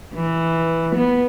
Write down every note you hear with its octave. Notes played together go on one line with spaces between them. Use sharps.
E3
B3